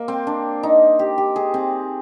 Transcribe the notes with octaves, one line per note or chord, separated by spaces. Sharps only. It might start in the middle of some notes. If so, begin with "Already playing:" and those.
Already playing: A#3
C4
D4
D#4
G4
G4
G#4
C4